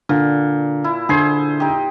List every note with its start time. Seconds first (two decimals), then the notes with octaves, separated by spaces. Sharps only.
0.09 A#2 D3
0.84 E4
1.09 D3 G#4 C5 G#6 C7
1.60 D#4 G4